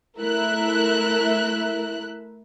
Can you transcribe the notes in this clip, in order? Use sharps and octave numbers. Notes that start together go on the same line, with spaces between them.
A3 E4 A#4 E5 F#6